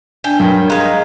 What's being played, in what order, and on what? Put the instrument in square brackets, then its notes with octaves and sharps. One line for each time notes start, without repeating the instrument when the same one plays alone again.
[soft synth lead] D4 [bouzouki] G5 [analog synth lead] G#5
[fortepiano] G2 [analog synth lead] F#3 [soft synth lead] A#4
[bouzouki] G#3 D#4 [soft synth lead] F5 [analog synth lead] A#5